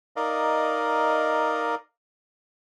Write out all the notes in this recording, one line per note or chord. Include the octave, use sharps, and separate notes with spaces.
D#4 A#4 D5 D#5 F5